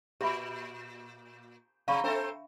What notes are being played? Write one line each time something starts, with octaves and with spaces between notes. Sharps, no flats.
A#2 G4 E5 B5
C3 F5 B5 C#6
C4 D4 A4 C5 E5